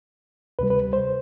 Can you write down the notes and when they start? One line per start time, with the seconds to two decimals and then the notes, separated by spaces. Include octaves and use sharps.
0.59 D2 C3 G3 B4
0.70 B4
0.93 C5